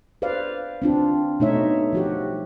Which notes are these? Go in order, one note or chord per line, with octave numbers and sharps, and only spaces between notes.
B4 C5 D5 F5
C4 D4 F4
B2 A3 D#4 C#5 E5
F3 F#4 G4